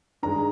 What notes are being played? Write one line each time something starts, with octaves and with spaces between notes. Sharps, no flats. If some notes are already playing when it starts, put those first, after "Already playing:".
G2 D#3 G#3 A#5